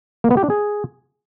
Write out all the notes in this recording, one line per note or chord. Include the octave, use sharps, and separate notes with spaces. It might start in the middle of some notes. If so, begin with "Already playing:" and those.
A#3
B3
G4
D4
G#4